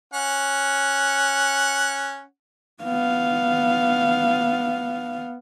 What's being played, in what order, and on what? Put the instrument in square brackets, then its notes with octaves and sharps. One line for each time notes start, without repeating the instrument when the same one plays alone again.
[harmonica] C#4 F#5
[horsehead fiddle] B3 F5